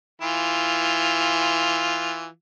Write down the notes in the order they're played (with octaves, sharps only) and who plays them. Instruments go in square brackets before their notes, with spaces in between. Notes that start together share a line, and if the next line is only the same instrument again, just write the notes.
[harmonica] E3 F4